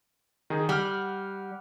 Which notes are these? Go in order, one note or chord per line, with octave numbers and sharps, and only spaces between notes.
D#3 D#4 G#4
G3 F#5 F6